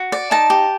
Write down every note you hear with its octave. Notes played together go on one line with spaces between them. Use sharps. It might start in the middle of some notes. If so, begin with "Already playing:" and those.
Already playing: F#4
D5
D#4 A5
G4